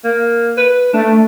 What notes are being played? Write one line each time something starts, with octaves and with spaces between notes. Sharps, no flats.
A#3
B4
A3 D4